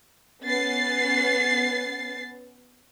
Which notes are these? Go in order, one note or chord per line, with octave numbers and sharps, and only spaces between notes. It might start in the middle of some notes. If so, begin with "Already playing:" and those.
B3 C#4 A6 C7